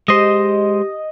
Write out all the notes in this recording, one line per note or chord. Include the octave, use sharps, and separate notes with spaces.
G#3 G4 C5 D#5